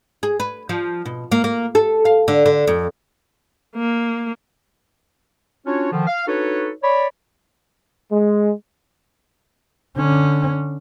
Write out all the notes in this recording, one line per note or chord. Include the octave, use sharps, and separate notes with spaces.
G#4
B4
F3
B2
A#3
A#3
A4
F5
D3
D3
F2
A#3
C#4 D4 F4 F#4 C#5
D3 D#3 F3
F5
D4 D#4 F#4 A4 B4 C#5
C#5 D5 B5
G#3
D3 C#4